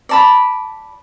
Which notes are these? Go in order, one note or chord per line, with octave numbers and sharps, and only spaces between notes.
D5 A5 B5